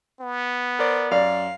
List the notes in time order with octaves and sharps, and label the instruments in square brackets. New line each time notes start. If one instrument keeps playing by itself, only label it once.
[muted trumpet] B3
[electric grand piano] A#4 D5 [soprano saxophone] C5
[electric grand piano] F#2 [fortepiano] D5 [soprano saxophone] F5